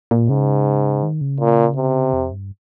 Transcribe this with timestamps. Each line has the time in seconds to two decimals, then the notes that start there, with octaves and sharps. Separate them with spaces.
0.11 A#2
0.29 G#2 C#3
1.03 D#3
1.21 C#3
1.40 A#2
1.76 C3
2.13 F2
2.32 G2